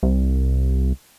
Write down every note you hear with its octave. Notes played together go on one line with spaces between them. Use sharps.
C2